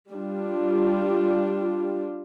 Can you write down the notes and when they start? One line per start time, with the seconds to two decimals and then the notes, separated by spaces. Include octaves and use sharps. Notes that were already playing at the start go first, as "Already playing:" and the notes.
0.11 G3 D4 F4